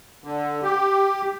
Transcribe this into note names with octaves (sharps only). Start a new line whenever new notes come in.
D3
G4